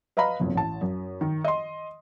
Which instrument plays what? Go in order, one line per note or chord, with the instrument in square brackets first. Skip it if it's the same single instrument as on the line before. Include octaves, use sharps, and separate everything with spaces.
[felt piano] B4 D#5 F5 A#5 B5
F#1 B1 F2
A1 A5
F#2
D#3
D#5 C6